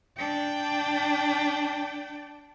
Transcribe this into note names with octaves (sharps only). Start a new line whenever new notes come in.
D4 G5